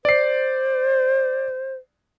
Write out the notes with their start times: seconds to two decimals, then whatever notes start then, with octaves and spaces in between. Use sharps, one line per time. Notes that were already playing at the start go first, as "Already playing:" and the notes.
0.05 C5 D5 C7